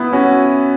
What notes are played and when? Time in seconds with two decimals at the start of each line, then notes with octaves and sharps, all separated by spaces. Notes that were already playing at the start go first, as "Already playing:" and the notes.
Already playing: B3 E4
0.13 C#4 F#4